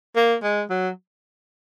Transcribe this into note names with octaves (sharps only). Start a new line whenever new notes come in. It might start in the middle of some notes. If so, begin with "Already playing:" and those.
A#3
G#3
F#3